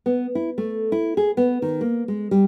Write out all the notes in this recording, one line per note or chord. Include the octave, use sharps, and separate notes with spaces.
B3
E4
A3
E4
G#4
B3
D#3
A#3
G#3
G3